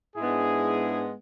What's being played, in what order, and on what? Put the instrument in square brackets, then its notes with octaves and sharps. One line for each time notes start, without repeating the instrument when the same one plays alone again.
[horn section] G#2 G#3 B3 D4 E4 G#4